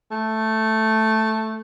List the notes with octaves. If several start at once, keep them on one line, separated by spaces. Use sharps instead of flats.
A3